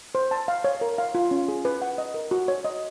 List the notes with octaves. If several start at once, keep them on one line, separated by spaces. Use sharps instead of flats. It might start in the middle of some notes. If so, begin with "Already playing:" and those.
C5
A5
F5
C#5
A#4
F5
F4
C#4
G#4
B4
F#5
D#5
A#4
F#4
C#5
D#5